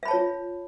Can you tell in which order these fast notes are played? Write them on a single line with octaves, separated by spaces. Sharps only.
E5 B5 A5 C#5 F4